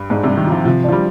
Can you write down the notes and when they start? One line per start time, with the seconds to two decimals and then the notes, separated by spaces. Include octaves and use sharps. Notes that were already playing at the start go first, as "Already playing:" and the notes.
Already playing: G2
0.10 G#2 D4
0.23 C3 G3
0.37 D#3
0.47 F3 F4
0.65 C3 F3
0.84 F3 D4
0.92 G3